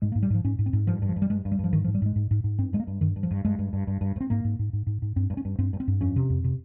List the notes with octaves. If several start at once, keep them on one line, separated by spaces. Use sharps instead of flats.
G#2 G#3
A#3
G#2
G3
G#2 F3
G#2 C#4
G#2
C4
G#2
G2 F3
G2
F3
G2
G3
G2 G#3
G2
G3
G2 F3
G#2 D#3
F3
G#2
G3
G#2 G#3
G#2
G#2
G#2
G2 C4
G2 G#3
A#3
G2
G2 D#3
G2
F3
G2
G2 G#3
G2
G2
G2
G2
G2
C4
G#2 A#3
G#2
G#2
G#2
G#2
G#2
G2 C4
G2
C#4
G2
G2 C4
G2
C4
G2
F2 C#4
C3
F2
C3